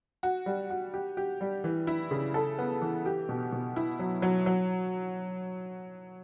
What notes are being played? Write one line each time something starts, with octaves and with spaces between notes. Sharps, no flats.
F#4
G3
F#4
G4
G4
G3
E3
E4
C#3
A4
B3
E3
G4
B2
B2
E4
F#3
F#3
F#3